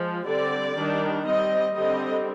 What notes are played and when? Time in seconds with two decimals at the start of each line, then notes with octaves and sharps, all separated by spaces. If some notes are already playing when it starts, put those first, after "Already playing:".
Already playing: F3 G#3
0.26 D3 G3 C4 D5
0.76 D#3 G3 D4
1.25 G3 C4 D#5
1.75 D3 G3 C4 D#5